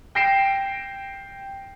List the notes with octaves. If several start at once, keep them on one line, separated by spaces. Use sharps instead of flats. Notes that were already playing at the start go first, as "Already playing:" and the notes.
G5 A#6 C7 D7 E7